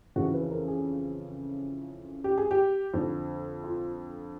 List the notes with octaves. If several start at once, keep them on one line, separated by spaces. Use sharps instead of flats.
F2 C#3 E3 F#4
B4
A#4
G#4
G4
G#4
G4
F2 D3
F4